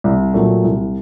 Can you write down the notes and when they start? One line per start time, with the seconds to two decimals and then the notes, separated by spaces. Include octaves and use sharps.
0.04 C2
0.34 A#2 F#3 A3
0.64 C2